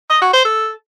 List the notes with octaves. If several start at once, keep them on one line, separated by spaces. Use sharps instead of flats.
D#5
F#4
C5
A4